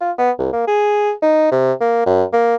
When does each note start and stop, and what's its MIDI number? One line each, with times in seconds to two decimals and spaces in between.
0.01 0.11 65
0.18 0.31 59
0.39 0.52 36
0.53 0.66 58
0.67 1.12 68
1.22 1.48 63
1.51 1.73 48
1.81 2.03 58
2.06 2.24 42
2.33 2.56 58